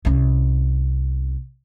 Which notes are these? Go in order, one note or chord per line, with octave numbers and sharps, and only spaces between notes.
C2 C#4